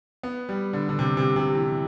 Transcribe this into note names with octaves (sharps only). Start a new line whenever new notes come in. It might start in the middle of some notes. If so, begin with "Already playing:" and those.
B3
G3
D3
D3
C3
C3
C3
E3